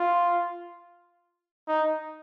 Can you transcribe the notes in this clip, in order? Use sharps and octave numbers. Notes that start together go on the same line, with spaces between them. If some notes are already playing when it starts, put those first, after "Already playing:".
Already playing: F4
D#4